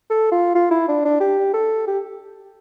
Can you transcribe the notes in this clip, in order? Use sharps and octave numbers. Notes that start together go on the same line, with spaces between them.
A4
F4
F4
E4
D4
D4
G4
A4
G4